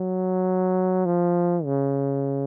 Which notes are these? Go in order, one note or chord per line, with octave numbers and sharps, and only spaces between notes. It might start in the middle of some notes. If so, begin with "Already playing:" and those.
Already playing: F#3
F3
C#3